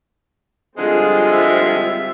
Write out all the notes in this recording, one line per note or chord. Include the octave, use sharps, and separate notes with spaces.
D3 F3 G3 G#3 C4 F4 G#4
E5